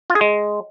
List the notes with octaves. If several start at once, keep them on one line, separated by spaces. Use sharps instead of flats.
F4
G#4
G#3